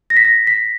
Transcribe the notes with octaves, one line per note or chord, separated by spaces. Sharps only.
A#6
B6
A#6
B6